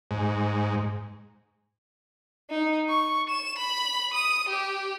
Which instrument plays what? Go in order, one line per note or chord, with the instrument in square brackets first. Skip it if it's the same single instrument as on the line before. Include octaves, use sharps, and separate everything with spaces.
[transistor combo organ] G#2
[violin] D#4
C#6
E7
B5
D#6
G4